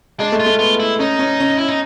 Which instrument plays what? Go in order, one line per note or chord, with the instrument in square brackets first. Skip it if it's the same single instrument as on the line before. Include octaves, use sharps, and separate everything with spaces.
[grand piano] G#3 [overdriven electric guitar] D4
[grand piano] A3
[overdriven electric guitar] F4
[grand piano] A3
[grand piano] B3 [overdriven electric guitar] F4
[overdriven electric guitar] E4
[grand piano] C#4 [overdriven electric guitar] D#4
[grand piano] C#4
C#4
[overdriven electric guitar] E4
D#4